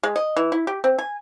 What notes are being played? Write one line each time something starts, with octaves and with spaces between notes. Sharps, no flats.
G#3
D#5
E3
E4
G4
C4
G#5